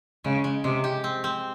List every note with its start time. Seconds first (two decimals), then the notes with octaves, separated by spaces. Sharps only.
0.24 C#3 G#3
0.44 G#3
0.64 C3 G#3
0.84 G4
1.04 C4
1.24 C4